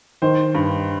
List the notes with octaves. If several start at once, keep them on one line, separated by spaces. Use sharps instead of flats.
D#3 C5
G2